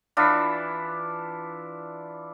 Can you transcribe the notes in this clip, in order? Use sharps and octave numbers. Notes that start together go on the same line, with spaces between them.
E3 D4 E4 F4